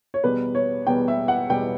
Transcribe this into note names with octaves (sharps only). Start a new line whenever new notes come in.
C#5
E2 B2 G3 B3 B4
C#5
E2 B2 G3 B3 G5
E5
F#5
E2 B2 G3 B3 G5